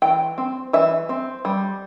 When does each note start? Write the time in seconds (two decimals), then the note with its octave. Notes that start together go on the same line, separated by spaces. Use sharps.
0.02 E3 G5
0.38 C4
0.73 E3 E5
1.09 C4
1.45 G3